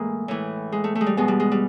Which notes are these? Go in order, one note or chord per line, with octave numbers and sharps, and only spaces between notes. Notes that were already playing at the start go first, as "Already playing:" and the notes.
Already playing: A2 E3 G#3 A#3
A2 E3
G#3
A3
A3
G#3
G3
B2 G#3
G3
G#3
G3